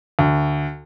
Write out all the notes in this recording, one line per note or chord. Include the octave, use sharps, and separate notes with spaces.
D2